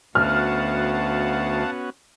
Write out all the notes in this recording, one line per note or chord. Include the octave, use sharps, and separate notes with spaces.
D2 B3 C#4 F#4 F5 F#5 A5 F6